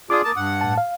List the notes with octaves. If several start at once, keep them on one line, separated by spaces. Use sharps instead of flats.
D4 F4 G#4 D6 D#6
A#3 A5
G2 F#5
A2 A5
F5